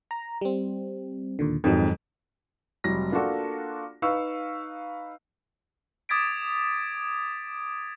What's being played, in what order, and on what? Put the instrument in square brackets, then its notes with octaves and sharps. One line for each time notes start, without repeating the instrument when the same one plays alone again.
[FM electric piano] A#5
G3 C4
D#2 A#2 D3
[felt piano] F2 G#2 [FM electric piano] D#3 F#3
[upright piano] F1 F#3 G3 A#6
A#3 D4 F4 F#4 A4
D#4 B4 F5 C#6 E6
[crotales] D6 D#6 G#6 A6 B6 D7